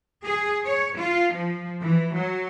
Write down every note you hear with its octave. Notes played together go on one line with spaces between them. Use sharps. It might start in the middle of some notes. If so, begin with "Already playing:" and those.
G#4
C#5
F4
F3
E3
F#3